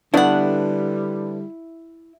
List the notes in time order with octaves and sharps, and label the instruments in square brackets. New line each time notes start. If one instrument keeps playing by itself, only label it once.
[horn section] D3 G3 [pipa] A3 F#5 [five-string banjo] B3 D4 [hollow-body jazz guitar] E4